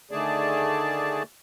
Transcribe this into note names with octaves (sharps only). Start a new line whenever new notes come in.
D3 D#3 A3 G#4 D5 A5